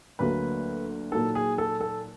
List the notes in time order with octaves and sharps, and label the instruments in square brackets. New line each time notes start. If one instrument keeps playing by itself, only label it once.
[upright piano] D2 D3 F#3 A#3 [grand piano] B4
[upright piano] A#2 F#3 A#3 D#4 [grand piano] A4
[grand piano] G#4
A4
A4